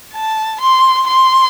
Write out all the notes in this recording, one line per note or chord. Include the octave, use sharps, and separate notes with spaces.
A5
C6
C6